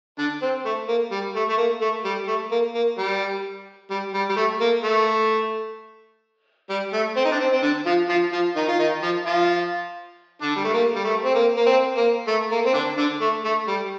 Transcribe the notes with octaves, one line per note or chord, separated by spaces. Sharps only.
D3 D4
C4
A3
A#3
G3
A3
A3
A#3
A3
G3
A3
A#3
A#3
G3
G3
G3
G3
A3
A#3
A3
G3
A3
C4
D#4
D4
C4
C4
D3 D4
F3 F4
F3 F4
F3 F4
D#3 D#4
F4
D#3 D#4
F3 F4
F3 F4
D3 D4
G3
A3
A#3
G3
A3
C4
A#3
A#3
C4
A#3
A3
A#3
C4
D3 D4
D3 D4
A3
A3
G3